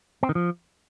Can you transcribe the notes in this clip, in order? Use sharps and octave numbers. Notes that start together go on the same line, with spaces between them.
C4
D#3
F3